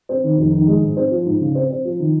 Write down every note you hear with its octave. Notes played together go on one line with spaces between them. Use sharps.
C4
D#3
F1
D#3
G#3
G#2
C4
F3
G#2
C#3
C4
C4
F3
D#3